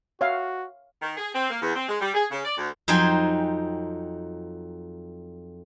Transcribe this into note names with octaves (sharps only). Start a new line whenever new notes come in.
F#4 C#5 E5 F5
D#3
G#4
C4
A#3
E2
C4
G#3
G3
G#4
C#3
D5
D2
F2 F#3 D#4 C5 G5 G#5